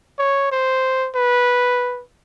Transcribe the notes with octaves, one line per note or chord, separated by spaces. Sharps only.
C#5
C5
B4